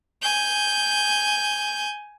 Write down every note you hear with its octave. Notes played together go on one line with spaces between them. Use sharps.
G#5 G6